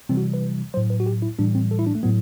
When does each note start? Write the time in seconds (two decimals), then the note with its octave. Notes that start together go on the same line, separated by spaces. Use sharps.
0.09 C3 E3 G3 C4
0.17 F#4
0.34 B4
0.74 A2 F#3 C5
0.90 B4
1.00 F#4
1.06 G4
1.22 E4
1.38 A2 E3 G3 D4
1.55 C4
1.71 A4
1.79 E4
1.87 D4
1.95 A3
2.03 A2 F#3 B3